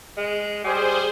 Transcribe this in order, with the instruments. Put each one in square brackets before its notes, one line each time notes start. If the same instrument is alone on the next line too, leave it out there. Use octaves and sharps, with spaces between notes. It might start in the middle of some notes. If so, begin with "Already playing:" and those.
[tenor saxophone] G#3
[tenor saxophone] G3 [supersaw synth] G#4 C5